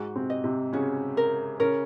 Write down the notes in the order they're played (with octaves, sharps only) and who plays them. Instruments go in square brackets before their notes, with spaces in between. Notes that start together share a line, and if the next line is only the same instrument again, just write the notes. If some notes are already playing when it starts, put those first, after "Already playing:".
Already playing: [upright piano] G#2 G#3 [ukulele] F#4
[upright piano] C3 C4
[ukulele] D#5
[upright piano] C3 C4
[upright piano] C#3 C#4 [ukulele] F#4
[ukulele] A#4
[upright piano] C#3 C#4 [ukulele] A#4